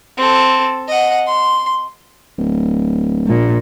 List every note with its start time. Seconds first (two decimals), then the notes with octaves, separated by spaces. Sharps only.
0.17 C4 A4
0.88 D#5 F#5
1.27 C6
2.38 D1
3.28 A#1 A#2